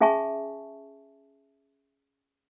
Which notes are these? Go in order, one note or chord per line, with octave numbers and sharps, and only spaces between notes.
C#4 G#4 E5 G#5 A5 C#6